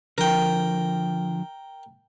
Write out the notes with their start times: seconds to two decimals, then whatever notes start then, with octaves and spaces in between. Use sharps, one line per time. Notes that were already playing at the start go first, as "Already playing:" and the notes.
0.18 D3 F3 A#4 G5